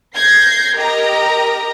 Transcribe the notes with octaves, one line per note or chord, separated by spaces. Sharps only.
G6 G#6 A#6 C7
G4 A#4 D#5 A#5